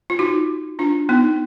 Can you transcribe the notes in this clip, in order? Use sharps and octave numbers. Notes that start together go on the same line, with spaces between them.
F4
D#4 F#4
D4 F4
B3 D#4